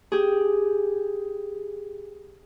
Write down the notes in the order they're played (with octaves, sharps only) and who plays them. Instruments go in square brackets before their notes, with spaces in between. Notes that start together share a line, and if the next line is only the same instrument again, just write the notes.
[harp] G4 G#4